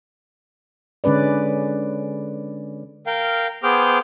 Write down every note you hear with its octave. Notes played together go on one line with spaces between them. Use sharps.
D3 G#3 C#4 B4 D5
A#4 F5 G5
B3 G#4 C5 G5 D6 F6